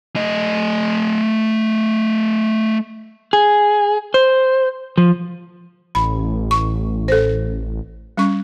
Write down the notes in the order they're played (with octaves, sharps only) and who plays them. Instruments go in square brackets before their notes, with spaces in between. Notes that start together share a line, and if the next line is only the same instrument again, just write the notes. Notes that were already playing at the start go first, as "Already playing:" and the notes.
[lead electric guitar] A3 D#5
[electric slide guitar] G#4
C5
F3
[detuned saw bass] A1 [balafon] B5
[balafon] C#6
A4 C5
G3 C#4 C#6